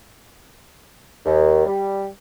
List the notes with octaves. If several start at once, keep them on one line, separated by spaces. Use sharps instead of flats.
D#2
G3